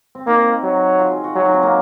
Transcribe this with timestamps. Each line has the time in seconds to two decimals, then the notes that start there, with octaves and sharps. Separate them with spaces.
0.15 C4
0.27 A#3 D#4
0.64 F#3
0.99 F4
1.11 G#4
1.24 F#4
1.36 F#3 F4
1.45 D#4
1.54 C4
1.63 A#3